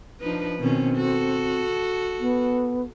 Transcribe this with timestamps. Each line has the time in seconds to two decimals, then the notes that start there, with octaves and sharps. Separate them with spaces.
0.20 F3 D4 D#4 B4
0.59 B2 D#3 C4 C#4
0.96 F#4 A4
2.20 B3